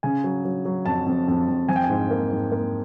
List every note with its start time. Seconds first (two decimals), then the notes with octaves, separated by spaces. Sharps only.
0.03 C#3 G#5
0.24 F#3
0.45 F#3
0.65 F#3
0.86 F2 A5
1.06 F2
1.28 F2
1.48 F2
1.69 F3 G#5
1.76 G5
1.84 G#5
1.89 G#2
2.11 A#3
2.31 G#2
2.52 A#3